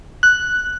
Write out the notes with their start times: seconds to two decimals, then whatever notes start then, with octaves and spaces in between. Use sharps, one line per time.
0.23 F#6